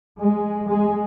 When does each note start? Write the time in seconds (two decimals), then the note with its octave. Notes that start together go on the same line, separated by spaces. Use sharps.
0.19 G#3
0.69 G#3